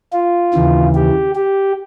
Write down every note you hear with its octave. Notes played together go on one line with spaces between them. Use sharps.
F4
D#2 C#3 E3
G4
G4